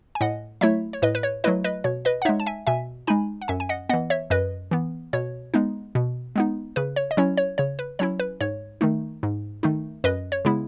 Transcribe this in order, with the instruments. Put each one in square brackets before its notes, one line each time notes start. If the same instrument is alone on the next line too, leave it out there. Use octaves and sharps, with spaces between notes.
[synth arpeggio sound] G#5
A2 D#5 F#5
F#3 A3 E4 C#5 E5
C#5
A2 B4 D#5
B4
C#5
F#3 A3 E4 B4 D#5
B4 D#5
B2 C#5
B4 D#5
F#5
D#4 C#5 E5
G#3
A5
E5 G#5
B2 E5 G#5
G#3 D#4 G#5 B5
F#5
F#2 E5 G#5
G#5
D#5 F#5
B3 D#5 F#5
E3
C#5 E5
F#2 B4 D#5
E3 B3
B2 C#5
G#3 B3 D#4
B2
G#3 B3 D#4
C#3 B4
C#5
D#5
F#3 C#4 E4 C#5
C#5
C#3 C#5
B4
F#3 C#4 E4 C#5
B4
G#2 C#5
D#3 A3 D#4
G#2
D#3 A3 D#4
F#2 B4 D#5
C#5
C#3 G#3 B3 E4